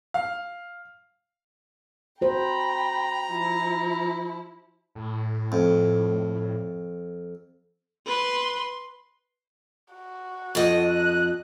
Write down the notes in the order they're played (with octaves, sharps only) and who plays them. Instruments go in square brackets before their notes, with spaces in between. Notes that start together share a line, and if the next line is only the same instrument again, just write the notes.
[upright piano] F5
[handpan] F#4 C5 [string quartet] G5 B5 [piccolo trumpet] A#5
[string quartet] F3 E4
[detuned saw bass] A2
[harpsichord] F2
[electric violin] B4 C6
[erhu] F#4
[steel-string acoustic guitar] F2 D#5
[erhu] F#6